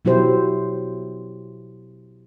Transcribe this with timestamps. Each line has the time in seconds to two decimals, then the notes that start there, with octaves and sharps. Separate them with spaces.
0.05 B2 F#3 E4 G4 C5